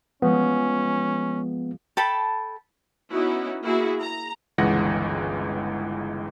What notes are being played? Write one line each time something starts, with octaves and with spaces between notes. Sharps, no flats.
F3 G#3 B3 C#4
A4 G5 A5 B5
B3 C#4 D#4 E4 F#4
A#3 E4 F#4 G#4
A#5
G1 C#2 E3 G#3 F#5 A#6